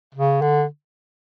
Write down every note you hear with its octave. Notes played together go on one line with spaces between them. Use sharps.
C#3
D3